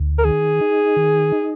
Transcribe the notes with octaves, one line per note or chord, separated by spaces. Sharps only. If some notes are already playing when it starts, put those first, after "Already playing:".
Already playing: D2
A#4
D#3 G#4
D#4
D#3
D#4